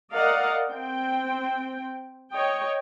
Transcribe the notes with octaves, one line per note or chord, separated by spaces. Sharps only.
A#4 D5 D#5 F5 F#5
C4 G5
C#5 D#5 G5